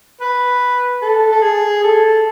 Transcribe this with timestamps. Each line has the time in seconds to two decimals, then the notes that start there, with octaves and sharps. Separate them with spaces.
0.21 B4
1.02 A4
1.32 A4
1.42 G#4
1.84 A4